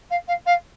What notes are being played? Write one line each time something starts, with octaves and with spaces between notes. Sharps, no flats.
F5
F5
F5